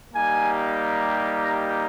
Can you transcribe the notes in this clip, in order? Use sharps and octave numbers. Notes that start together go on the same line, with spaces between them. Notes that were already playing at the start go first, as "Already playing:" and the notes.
G3 A#3 D#4 G4 G#5
A#5